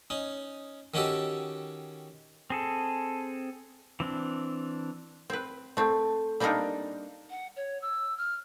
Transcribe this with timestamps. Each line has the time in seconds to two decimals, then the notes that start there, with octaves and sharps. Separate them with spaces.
0.10 C#4 D#4
0.94 D#3 C#4 F#4 G4 A4
2.50 C4 G#4 A4
4.00 E3 C4 D4
5.30 C4 B4
5.77 A3 C4
6.40 G3 A#3 C4 D4 D#4 A#4
7.30 F#5
7.56 C#5
7.82 E6
8.17 F6